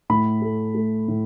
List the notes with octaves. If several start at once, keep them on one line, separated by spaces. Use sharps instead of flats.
A2 B5
A3
A3
A2